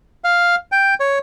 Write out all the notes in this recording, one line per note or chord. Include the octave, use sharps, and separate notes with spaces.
F5
G5
C#5